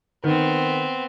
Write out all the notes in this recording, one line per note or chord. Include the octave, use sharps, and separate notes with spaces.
D#3 B3 C4